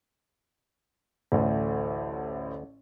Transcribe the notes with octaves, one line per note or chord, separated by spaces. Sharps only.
A1 D2 A2